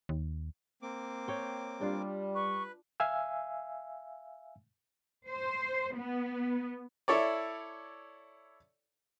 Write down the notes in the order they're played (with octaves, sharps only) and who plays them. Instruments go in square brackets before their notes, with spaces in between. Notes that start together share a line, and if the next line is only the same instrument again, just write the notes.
[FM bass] D#2
[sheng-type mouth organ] A#3 C4 D6
[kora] C#5 G5
[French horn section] G3 [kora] D4 F4
[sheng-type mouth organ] B4 [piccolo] C#6
[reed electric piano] E5 F5 G#5 E6
[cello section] C5
B3
[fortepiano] E4 A4 C#5 D5